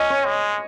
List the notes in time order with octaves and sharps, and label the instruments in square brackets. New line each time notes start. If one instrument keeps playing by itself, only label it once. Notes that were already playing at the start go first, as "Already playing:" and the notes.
Already playing: [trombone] C#4 [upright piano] D#5
[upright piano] C#5
[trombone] G#3